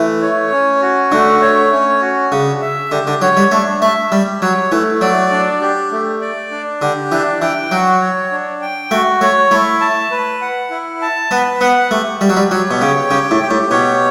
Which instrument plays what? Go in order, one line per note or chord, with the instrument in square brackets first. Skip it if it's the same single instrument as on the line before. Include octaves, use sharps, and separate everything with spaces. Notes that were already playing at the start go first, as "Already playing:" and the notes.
Already playing: [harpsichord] E3 [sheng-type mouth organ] A3
[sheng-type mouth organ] C#5
C#4
F#4
[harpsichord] D3 [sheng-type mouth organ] A3
[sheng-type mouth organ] C#5
C#4
F#4
[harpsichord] C#3 [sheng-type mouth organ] D4
[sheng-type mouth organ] E5
[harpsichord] D3 [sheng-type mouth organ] G4
[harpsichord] D3
[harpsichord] F#3 [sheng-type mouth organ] C#5
[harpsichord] G3
[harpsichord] A3 [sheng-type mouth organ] D4
[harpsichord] A3 [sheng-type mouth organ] E5
[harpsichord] G3 [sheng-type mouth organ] G4
[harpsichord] F#3 [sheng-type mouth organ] C#5
[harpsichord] E3 [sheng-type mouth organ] A3
[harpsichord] F#3 [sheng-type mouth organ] D5
[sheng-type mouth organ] D4
G4
A3
D5
D4
[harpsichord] D3 [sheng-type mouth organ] G4
[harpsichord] E3 [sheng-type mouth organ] D4
[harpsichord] E3 [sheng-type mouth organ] G5
[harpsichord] F#3 [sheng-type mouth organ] F#4
[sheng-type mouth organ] C#5
D4
G5
[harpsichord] A3 [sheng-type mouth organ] F#4
[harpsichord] A3 [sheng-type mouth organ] C#5
[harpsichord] A3 [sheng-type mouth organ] E4
[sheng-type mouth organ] A5
B4
F#5
E4
A5
[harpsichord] B3 [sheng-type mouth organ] B4
[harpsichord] B3 [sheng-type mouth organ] F#5
[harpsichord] A3 [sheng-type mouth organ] G4
[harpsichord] G3 [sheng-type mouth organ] G4
[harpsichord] F#3
G3
[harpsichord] F#3 [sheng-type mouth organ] C#5
[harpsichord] B2
[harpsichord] C#3 [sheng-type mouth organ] G5
[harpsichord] C#3 [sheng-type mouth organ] G4
[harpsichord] A2
[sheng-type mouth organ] G4
[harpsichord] A2
[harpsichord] B2 [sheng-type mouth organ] C#5